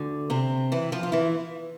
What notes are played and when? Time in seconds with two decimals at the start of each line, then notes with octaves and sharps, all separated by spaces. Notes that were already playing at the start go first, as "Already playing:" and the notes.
Already playing: D2 D3
0.30 C3 C4
0.72 E3 E4
0.92 F3 F4
1.03 F4
1.12 E3 E4